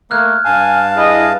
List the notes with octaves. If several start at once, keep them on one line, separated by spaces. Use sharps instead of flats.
A3 A#3 F6 F#6 G#6
G2 F5 G#5 A5
E4 G#4 D#5